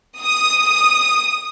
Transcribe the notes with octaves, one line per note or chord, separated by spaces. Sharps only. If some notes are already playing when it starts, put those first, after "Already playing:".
D#6